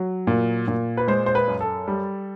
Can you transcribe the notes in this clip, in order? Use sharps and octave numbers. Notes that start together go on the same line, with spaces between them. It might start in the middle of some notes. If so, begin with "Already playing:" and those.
Already playing: F#3
A#2
A#2
B4
G#3 C5
C5
B4
F#2
A4
G3